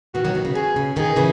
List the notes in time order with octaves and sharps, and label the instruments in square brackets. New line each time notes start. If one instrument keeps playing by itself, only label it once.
[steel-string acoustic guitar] B2 D#3 [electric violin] F#4
[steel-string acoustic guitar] D#3 F#3
B2 D#3
C#3
[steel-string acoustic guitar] B2 [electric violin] G#4
[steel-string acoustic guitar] C#3
[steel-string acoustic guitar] B2 D#3 [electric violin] G#4
[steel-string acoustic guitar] C#3 E3